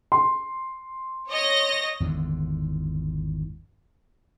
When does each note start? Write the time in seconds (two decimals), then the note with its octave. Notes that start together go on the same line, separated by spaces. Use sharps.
0.12 C6
1.29 C#5 D#5 A#6
2.00 G#1 E2 G#2 D3